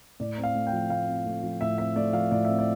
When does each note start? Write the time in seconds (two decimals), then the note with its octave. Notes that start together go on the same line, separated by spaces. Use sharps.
0.20 A2 D5
0.38 C4
0.43 F5
0.55 A3
0.67 G5
0.73 F3
0.90 A2 F5
1.08 C4
1.26 A3
1.43 F3
1.61 A2 E5
1.78 C4 E5
1.96 A3 D5
2.13 F3 F5
2.31 A2 D5
2.45 C4 E5
2.59 D5